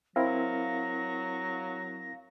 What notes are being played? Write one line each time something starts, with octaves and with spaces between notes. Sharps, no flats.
F#3 C4 E4 A#4 F5 A#6